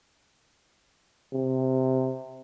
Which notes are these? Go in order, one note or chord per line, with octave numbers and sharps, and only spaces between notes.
C3